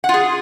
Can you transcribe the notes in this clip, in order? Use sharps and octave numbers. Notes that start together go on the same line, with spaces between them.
F4 G#4 F#5